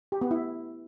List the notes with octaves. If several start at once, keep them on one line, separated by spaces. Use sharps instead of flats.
G4
B3
E4